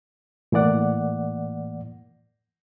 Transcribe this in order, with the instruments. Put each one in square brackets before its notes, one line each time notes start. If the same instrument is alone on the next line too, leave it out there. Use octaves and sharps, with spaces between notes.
[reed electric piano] A2 E3 A#3 D5 F#5